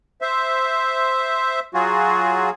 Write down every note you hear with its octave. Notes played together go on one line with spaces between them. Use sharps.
C5 E5
F#3 F4 F#4 G#4